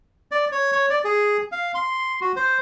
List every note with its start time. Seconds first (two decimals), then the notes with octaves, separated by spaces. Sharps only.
0.31 D5
0.52 C#5
0.72 C#5
0.90 D5
1.04 G#4
1.52 F5
1.75 C6
2.21 F#4
2.36 C5